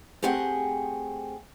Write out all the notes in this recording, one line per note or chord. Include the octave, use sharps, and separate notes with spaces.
A3 C4 G4 G#4 F#5